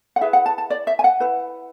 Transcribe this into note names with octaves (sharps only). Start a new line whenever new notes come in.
F#5
E4 G#4 B4 E5
F#5
A5
A5
D5
E5
G#5
F#5
E4 B4